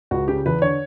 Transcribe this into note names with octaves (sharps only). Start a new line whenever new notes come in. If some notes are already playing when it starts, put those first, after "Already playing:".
C#2 F#4
C#3 G4
E2 B4
D3 C#5